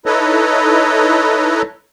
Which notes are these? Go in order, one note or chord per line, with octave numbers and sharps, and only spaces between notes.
D#4 E4 A4 B4 C#5 D#5